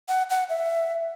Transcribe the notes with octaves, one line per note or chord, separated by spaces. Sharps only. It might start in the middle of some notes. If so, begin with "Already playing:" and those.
F#5
F#5
E5